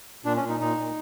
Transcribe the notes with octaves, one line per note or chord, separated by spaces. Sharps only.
A#2 D4
C#4
A#2
D#4
A#2 D#4
A#2